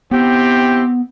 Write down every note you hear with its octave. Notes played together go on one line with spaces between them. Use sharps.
B3 C4 E4 G4